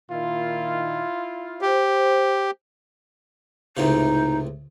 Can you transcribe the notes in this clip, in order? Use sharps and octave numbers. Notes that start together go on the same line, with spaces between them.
A#2 D#3 E4 F4
G4 C5
C#2 A2 C3 D#4